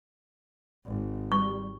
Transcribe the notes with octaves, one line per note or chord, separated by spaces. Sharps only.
G#1
G3 C#6